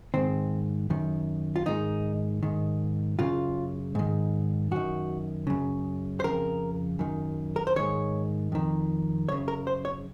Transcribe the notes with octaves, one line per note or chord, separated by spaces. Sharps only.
G#2 D#3 C4
F#2 D#3
F4
G#2 D#3 D#4
G#2 D#3
F#2 C#3 F4
G#2 D#3
F#2 D#3 F#4
F#2 C#3
C5
F2 C#3 A#4
F#2 D#3
A#4
C5
G#2 D#3 C#5
F2 D#3
F#2 C#3 C#5
A#4
C5
C#5